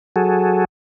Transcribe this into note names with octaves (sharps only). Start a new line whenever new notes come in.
F#3 F#4 G#4 A4